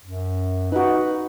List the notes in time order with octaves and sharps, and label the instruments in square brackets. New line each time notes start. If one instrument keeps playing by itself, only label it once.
[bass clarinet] F#2
[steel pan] D#4 F#4 [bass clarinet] B4